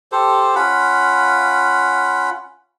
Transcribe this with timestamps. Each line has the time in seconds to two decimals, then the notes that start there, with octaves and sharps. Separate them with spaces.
0.12 G4 A4 C5
0.55 C#4 F4 F#5 B5